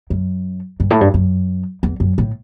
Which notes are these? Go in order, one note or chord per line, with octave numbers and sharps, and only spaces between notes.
F#2
G2
A2
G2
F#2
E2
F#2
A2